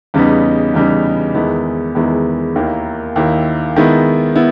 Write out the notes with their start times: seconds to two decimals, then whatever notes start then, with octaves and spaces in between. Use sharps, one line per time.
0.14 E2 C#3 G3 B3 D#4
0.74 E2 C#3 G3 B3 D#4
1.34 E2 D#3 G#3 B3 E4
1.95 E2 D#3 G#3 B3 E4
2.56 D#2 D#3 A#3 E4
3.16 D#2 D#3 A#3 E4
3.76 D#3 G#3 B3 E4
4.36 B3 E4